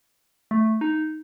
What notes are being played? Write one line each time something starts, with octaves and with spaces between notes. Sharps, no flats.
A3
D#4